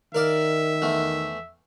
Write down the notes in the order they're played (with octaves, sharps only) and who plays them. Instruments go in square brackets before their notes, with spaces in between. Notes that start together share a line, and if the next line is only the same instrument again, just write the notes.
[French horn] D#3 [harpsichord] A#4 D5 F5 [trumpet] E5
[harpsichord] E2 A3